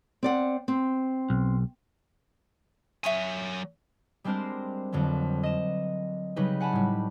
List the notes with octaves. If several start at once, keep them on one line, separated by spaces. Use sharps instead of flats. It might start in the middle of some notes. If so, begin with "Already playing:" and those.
C4 D5 F#5
C4
B1
F#3 E5 G#5 C#6 D#6
G3 G#3 C4 D4 A#4 C5
F2 D3 F#3 G3
D#5 E7
C#3 F#3 G3 D#4 B4
F#5 G#5 A5 B5
A2 G3